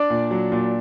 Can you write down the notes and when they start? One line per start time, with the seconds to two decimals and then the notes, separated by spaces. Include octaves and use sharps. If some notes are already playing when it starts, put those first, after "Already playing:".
Already playing: D4 D5
0.10 A#2
0.31 F#3
0.52 A#2